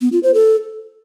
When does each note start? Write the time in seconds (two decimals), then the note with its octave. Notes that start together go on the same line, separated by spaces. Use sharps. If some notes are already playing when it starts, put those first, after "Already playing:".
0.01 B3
0.12 F4
0.23 C5
0.34 A4